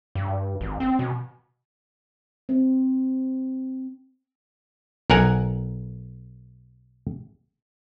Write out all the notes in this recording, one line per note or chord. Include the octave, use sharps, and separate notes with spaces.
G2
G#1
C4
B2
C4
B1 A#4 F#5 G#5